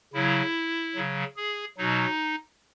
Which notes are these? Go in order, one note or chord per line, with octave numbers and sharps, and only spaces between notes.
C#3 F#3 E4
C#3 F#3
G#4
B2 F#3 D#4